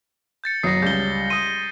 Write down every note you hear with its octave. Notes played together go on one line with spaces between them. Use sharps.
G6 A6 C#7
F#1 F#3 D#6 A#6 C7
C#2 G3 C#4 G6 G7
C6 D#6 D#7